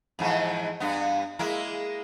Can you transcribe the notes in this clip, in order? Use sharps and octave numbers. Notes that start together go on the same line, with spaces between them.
F2 G#2 E3
G2 B3
G#3 A#3 E4